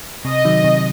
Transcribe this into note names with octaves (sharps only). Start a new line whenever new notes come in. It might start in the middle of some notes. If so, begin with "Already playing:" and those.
C3 D#5
D#3 F#3
C3